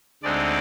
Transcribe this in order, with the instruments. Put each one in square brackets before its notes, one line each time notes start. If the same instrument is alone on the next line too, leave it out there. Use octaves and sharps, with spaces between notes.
[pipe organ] D2 D3 G#3 C4 D#4 D5